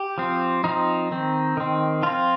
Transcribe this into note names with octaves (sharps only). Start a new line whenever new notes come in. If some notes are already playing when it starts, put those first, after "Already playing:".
Already playing: G4
F3 C4
F3 C4 D#4
D#3 C4
D#3 C4
F3 C4 F4